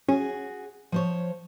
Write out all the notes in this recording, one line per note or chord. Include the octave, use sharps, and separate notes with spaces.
C#4 F#4 G#4
F3 C5 C#5